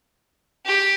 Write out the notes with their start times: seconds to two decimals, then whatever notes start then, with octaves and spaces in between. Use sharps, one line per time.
0.66 G4